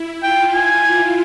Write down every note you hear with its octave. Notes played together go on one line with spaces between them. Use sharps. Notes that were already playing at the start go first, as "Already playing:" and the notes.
Already playing: E4
F4 G5
G#5